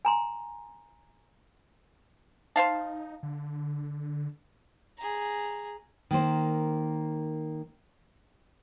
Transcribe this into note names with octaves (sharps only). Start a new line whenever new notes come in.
G#5 A#5 C6
D#4 C5 F5 A5
D3
G#4 A#5
D#3 A#3 C5